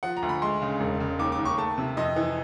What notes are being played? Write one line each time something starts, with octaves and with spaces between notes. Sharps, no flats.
F3 F#5
A#5
D2
B5
G#3 C6
C#3
E1
C#3
D#2 D6
D6
D#2
C#6
A3 A5
C3
F2 D#5
E3